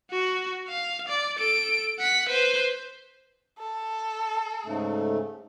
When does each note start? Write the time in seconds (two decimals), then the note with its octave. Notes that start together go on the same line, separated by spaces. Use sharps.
0.11 F#4
0.68 F5
1.08 D5
1.39 A4 D7
1.99 F#5 B6
2.29 B4 C5
3.59 A4
4.65 G#2 C#3 A3